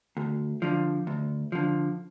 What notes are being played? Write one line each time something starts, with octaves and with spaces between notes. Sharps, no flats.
D2
D3 F3
D2
D3 F3